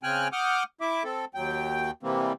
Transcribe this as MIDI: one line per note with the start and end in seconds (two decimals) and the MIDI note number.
0.03 0.28 49
0.03 0.28 60
0.03 0.28 79
0.03 0.28 80
0.03 0.28 89
0.03 0.28 90
0.33 0.63 78
0.33 0.63 86
0.33 0.63 87
0.33 0.63 89
0.33 0.63 91
0.81 1.03 64
0.81 1.03 76
0.81 1.03 86
1.04 1.25 60
1.04 1.25 69
1.35 1.91 39
1.35 1.91 54
1.35 1.91 79
2.03 2.33 48
2.03 2.33 52
2.03 2.33 55
2.03 2.33 58
2.03 2.33 60